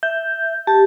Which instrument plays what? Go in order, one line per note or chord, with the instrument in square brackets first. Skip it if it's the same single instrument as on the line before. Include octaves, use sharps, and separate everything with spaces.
[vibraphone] E5 [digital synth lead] G6
[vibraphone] G4 [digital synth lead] A5